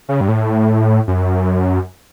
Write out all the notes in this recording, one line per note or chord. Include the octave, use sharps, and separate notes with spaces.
C#3
G2
A2
F#2